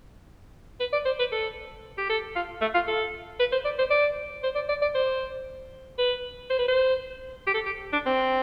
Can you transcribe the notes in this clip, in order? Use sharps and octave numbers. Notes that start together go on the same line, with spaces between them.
B4
D5
C5
B4
A4
G4
A4
F4
A3
F4
A4
B4
C5
D5
C5
D5
C5
D5
D5
D5
C5
B4
C5
B4
C5
G4
A4
G4
D4
C4